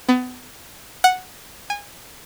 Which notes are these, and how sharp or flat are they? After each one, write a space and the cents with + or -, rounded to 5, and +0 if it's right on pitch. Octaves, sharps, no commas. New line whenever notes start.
B3 +30
F#5 -5
G#5 -25